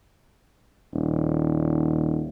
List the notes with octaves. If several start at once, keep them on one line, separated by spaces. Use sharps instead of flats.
D#1